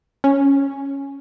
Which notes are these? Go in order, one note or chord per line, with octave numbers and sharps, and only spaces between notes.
C#4